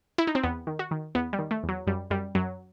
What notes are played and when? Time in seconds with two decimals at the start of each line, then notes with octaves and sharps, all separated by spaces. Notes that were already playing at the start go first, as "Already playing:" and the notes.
0.18 E4
0.27 D#4
0.35 C4
0.43 E2 B3
0.67 D#3
0.79 F#4
0.91 D#3
1.15 E2 B3
1.33 G3
1.39 D#3
1.51 A3
1.63 E2
1.69 F#3
1.87 F#2 G3
2.11 F#2 G3
2.35 F#2 F#3